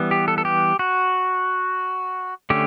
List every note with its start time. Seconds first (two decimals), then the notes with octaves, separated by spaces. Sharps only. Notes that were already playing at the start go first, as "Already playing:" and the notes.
Already playing: E3 G3 B3
0.11 G4
0.28 A4
0.38 A4
0.45 G4
0.79 F#4
2.50 D3 A3 C#4 G4